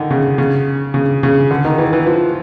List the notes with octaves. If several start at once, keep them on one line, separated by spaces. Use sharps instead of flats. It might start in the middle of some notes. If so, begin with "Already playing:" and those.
Already playing: D3 D#3
C#3
C#3
C#3
C#3
D3
D#3
E3
E3
F3